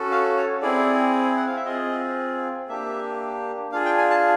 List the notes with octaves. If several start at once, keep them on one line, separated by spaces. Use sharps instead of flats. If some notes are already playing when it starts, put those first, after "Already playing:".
Already playing: C#4 F#4 A4
F5
C#5
C4 E4 G#4 D5
F#5
F5
E5
C4 F4 G#4 D#5
A#3 D4 G4 E5
D4 F4 G#4 F5
G5
G#5
A5